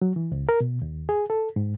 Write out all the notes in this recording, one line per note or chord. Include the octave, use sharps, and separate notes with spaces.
F#3
E3
C#2
A#4
B2
D#2
G#4
A4
G#2